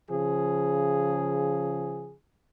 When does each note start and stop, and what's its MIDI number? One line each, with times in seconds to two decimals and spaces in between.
0.11 2.14 49
0.11 2.14 53
0.11 2.14 68